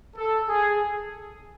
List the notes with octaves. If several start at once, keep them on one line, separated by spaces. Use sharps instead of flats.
A4
G#4